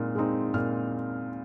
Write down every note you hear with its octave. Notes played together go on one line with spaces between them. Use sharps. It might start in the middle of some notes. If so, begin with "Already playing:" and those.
Already playing: A#2 G#3 C4 D#4 F6
G#3 C4 D#4
A#2 F6